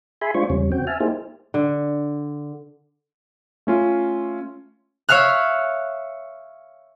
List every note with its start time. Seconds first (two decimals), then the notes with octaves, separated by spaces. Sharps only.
0.22 G#4 E5 G#5 B5 C6
0.34 G#3 D4 F4 C5 C#6
0.50 E2 C#3 G3 C#4
0.72 C4 F#4 G5
0.87 E5 G#5 A5 F6
1.00 A#3 D#4 E4 G4 G#4 C5
1.54 D3
3.67 A3 C#4 F4
5.09 C#5 E5 F5 F6 F#6